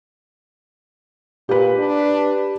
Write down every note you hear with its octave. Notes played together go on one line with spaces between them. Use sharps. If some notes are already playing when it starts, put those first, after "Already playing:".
A#2 G4 B4
D4